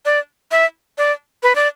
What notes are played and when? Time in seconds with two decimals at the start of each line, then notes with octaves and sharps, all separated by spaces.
0.05 D5
0.51 E5
0.98 D5
1.43 B4
1.55 D5